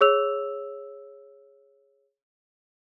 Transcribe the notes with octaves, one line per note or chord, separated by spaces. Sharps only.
G#4 C#5 E6 F7